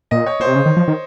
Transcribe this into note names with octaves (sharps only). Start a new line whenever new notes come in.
A#2 D#5
C#5
A#2 C5
C3
C#3
D#3
F3
D#3